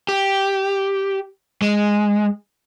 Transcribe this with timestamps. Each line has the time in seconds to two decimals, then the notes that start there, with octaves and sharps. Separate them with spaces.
0.09 G4
1.62 G#3